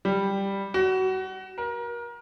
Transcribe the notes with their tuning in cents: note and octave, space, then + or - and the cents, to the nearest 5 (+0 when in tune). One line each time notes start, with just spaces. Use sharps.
G3 +5
F#4 +25
A#4 +30